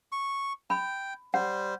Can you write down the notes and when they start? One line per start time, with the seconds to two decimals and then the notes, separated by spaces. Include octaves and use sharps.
0.12 C#6
0.70 G5 B5
1.34 G3 C5 F#5